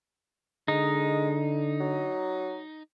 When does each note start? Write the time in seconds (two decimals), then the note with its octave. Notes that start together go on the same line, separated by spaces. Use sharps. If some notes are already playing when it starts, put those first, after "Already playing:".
0.68 D3 G#3 D#4
1.80 F#3